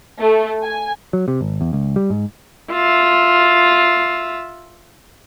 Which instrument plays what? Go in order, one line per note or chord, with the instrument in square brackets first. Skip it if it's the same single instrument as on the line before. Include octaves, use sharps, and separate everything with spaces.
[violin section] A3
G#5
[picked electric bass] F#3
C3
G#1
E2
C#2
G3
G#2
[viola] F4 E5